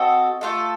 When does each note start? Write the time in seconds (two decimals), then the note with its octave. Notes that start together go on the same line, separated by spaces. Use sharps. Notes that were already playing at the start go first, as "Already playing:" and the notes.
Already playing: C4 F#4 A4 D#5
0.41 A3 C4 F4 A4